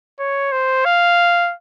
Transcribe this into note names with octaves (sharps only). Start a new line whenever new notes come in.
C#5
C5
F5